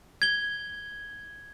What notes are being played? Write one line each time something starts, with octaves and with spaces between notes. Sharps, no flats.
G#6 G7